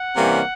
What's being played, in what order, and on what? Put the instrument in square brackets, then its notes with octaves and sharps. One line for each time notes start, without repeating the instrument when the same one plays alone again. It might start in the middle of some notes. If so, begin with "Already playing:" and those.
Already playing: [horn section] F#5
C3 E3 G3 A#3 C#4